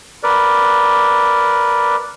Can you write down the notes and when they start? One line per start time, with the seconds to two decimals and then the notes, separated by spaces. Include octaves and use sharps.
0.23 A#4 B4 D5